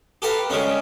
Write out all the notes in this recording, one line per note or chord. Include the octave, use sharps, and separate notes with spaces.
G4 A4 B4 F5 A#5
C#3 G3 G#3 C#4